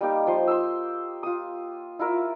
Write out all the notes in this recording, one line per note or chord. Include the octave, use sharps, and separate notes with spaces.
G3 A#3 D#4 G4
F3 C6
C6 D#6 E6
F4 D#6
E4 F4 A#4 E5